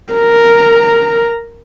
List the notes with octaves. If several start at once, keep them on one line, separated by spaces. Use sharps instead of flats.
A#4 A#5